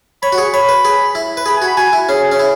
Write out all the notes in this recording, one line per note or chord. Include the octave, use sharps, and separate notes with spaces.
C#5 B5
F#4
G#4 C#6
C#5 B5
B4
G#4
E4
B4
G#4 B5
G#5
F#4
B5
F#4 G#5
E4
C#4 G#4
C#4
E4